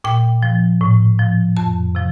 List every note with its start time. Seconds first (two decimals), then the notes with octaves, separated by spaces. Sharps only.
0.04 A#2 G5
0.43 F3
0.81 A2
1.19 F3
1.57 F2 A5
1.95 C3 F3